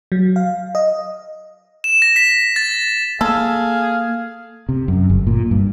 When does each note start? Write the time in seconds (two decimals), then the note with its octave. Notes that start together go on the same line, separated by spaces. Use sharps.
0.12 F#3
0.36 F5
0.75 D#5
1.84 E7
2.02 A#6
2.16 B6
2.56 A6
3.21 A#3 G#4 A4 F5
4.69 C3
4.88 F#2
5.10 G1
5.27 A#2
5.51 G2